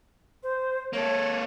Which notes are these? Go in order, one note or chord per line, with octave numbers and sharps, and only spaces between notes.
C5
A#3 A4 C#5